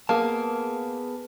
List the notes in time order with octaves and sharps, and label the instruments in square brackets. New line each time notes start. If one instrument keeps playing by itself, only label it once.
[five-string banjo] A#3 [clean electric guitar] B3 G#4 A5